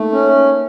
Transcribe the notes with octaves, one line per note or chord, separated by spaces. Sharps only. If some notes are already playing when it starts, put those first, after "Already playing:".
Already playing: A3 A#3 D#4
C#4